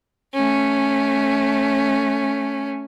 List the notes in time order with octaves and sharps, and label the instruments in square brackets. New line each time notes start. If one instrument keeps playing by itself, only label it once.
[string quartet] A3 C#4